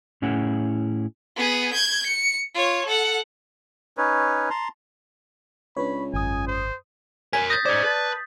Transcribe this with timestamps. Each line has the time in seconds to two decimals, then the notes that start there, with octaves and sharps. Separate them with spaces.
0.22 A2 C#4 E4 G#4 F#5
1.36 B3 G#4
1.73 G6 G#6
2.06 C#7
2.55 F4 C#5
2.86 A4 F#5
3.98 C#4 D#4 B4 C#5
4.50 A5 A#5 C6
5.77 C#2 D4 B4 C#5 B5
6.14 G#1 F#2 G#5 D#6
6.47 C5
7.33 A#4 C#5 G#5 B6
7.50 D#6 G6 A6 A#6
7.65 C#4 G#4 C5 D5
7.84 B4 A5